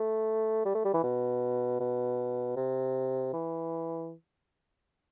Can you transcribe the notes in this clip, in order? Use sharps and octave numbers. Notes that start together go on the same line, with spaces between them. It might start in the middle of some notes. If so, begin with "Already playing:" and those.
Already playing: A3
G3
A3
G3
E3
B2
B2
C3
E3